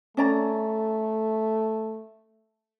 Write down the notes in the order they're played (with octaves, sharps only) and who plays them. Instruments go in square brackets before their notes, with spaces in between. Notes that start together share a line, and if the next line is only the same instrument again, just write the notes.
[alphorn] A3 [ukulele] C#4 D5 A#5